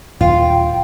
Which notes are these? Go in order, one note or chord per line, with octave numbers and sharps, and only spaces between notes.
D#1 F4 G5